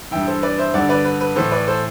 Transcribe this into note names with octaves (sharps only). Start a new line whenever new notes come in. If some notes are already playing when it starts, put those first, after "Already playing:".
G2 E3 E5 G5
A4 C5
B4 D5
C5 E5
G2 D3 D5 F#5
B4 D5
B4
B4
A2 E3 A4 C5
B4 D5
A4 C5